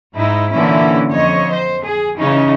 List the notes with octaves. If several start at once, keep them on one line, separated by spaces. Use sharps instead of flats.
G#2 D#4 E4
A#2 D3 E3 C#4 E4
F2 C#5 D#5
C5
G#4
C#3 E3 C#4 D#4